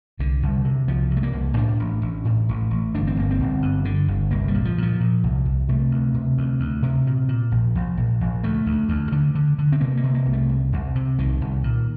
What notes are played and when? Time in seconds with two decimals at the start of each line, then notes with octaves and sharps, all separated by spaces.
0.19 C2 D3
0.43 C2
0.65 C3
0.88 C2 F3
1.11 C3
1.16 A3
1.23 A#3
1.33 C2
1.57 A2 D4
1.80 A1
2.02 A1
2.25 A2
2.49 A1
2.71 A1
2.94 G1 D4
3.07 C4
3.17 G1 A#3
3.31 C4
3.40 G1
3.62 G2
3.85 D3
4.08 G1
4.31 C2 A#3
4.48 G3
4.54 A#2
4.65 F3
4.78 A#2 F3
5.00 A#2
5.24 C2
5.46 C2
5.68 C3 A3
5.91 D2
6.14 C3
6.37 D2
6.60 D2
6.83 C3
7.07 A#2
7.28 A#2
7.52 A#1
7.75 A#1
7.97 A#1
8.21 A#1
8.43 D2 A3
8.66 D2
8.89 D2
9.12 D3
9.35 D3
9.58 D3
9.72 C4
9.81 C3 A#3
9.97 A#3
10.03 C3
10.14 A#3
10.26 C2
10.33 A3
10.49 C2
10.73 C2
10.95 C3
11.19 C2 D#3
11.41 C2
11.64 A#2